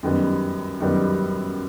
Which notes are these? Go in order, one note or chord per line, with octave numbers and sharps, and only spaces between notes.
F#2 D#3 G3 B3
F#2 D#3 G3 B3